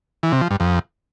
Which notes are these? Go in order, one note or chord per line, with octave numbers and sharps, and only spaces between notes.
E3
C3
F3
G2
F2